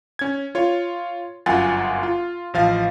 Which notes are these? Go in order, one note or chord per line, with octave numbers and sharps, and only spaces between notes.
C#4 G#6
F4 C#5
G1 F#2 F4 F#5 G#5 A6
F4
A1 F3 F5 A6